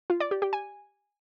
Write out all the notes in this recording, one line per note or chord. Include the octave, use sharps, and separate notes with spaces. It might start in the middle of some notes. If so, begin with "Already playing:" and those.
F4
D5
G4
G4
G#5